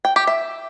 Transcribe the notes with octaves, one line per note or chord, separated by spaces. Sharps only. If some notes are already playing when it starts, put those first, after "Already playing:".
G5
G4
E5